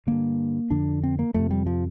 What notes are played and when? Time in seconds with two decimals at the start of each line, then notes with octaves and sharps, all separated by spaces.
0.07 G2 D3 A#3
0.71 F2 D3 D4
1.03 C4
1.19 A#3
1.34 F2 C3 A3
1.51 G3
1.66 F3